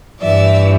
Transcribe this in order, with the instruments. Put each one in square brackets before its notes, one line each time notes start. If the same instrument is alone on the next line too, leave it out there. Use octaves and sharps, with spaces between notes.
[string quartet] G2 E3 D5 E5